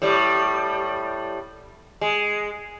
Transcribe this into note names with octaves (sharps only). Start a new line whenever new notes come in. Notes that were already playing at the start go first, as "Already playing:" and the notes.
A2 G3
G#3